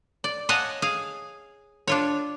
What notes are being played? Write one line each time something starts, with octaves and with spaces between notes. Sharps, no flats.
D5
C#5 D#5 F5 F#5 G#5 A5
G#4 F5
D4 F4 C#5